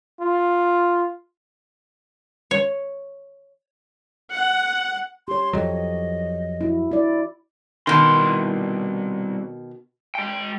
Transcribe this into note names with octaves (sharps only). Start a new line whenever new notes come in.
F4
C#5
F#5
G4 C#5 C6
F2 F#3 D#5
E4 F#4
E4 D5
C2 B2 D#3 C6
G#3 G5